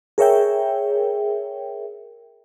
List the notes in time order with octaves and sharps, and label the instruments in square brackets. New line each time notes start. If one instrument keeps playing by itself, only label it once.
[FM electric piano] G#4 A#4 C#5 E5 G5